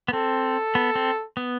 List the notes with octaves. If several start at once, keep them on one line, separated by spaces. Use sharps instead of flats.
B3
C4 A4
B3
C4
B3